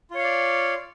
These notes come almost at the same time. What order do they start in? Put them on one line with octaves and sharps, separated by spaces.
F4 C#5 F5 D5